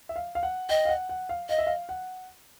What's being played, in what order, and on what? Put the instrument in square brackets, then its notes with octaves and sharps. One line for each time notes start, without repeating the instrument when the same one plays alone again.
[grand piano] E5
F5
F5
F#5
[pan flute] D#5 [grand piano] G5
[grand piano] F5
F#5
F#5
F5
[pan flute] D#5 [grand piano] F5
[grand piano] E5
F5
F#5